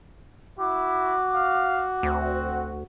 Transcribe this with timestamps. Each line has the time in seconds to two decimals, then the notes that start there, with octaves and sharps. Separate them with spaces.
0.59 E4 F#4 D6
1.35 F5
2.03 D2 C4